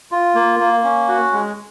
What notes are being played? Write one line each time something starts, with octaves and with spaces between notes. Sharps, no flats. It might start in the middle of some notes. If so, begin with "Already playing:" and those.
F4
A#3
A#3
C#4
F#4
G#3